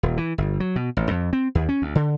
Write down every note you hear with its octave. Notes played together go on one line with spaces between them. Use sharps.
D#1
E3
G1
F#3
B2
A1
F2
C4
D#2
C#4
D2
D3